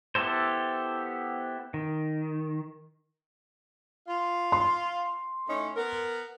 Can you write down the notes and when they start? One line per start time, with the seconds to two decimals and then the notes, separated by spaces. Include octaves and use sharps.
0.15 B3 E4 G4 A4 C5
1.74 D#3
4.07 F4
4.52 C6
5.49 A2 C#4 D#4
5.76 B3 A#4